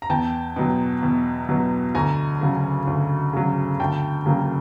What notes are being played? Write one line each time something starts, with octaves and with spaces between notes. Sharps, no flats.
A#5
E2 G5 A5
B2 F#3
E2
B2 F#3
D2 G#5 A#5
C#3 F#3
D2
C#3 F#3
D2 G5 A5
C#3 F#3 A#3